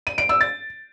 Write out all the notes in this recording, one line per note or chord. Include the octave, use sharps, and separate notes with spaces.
D#7
D7
E6
A6